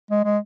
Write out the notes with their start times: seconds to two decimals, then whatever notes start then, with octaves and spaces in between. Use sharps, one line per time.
0.11 G#3
0.25 G#3